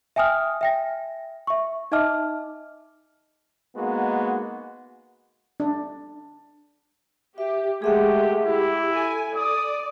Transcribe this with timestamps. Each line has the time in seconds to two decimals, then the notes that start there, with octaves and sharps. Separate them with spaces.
0.16 E5 G5 G#5 D#6 F6
0.61 E5 G5 A#6
1.47 E5 C#6
1.92 D#4 D#5 E5 A5 D6 F6
3.76 G#3 A#3 B3 D#4 F#4
5.60 D4
7.38 G4 E5
7.82 G#3 A3 G4 G#4 E5 F#5
8.45 E4 G4
8.95 A4 G#5
9.36 D5 D#6